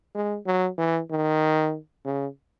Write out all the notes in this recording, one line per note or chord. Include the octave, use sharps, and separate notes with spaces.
G#3
F#3
E3
D#3
C#3